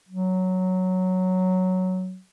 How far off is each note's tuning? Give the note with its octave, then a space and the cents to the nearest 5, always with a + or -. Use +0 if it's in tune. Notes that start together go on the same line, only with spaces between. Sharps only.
F#3 +0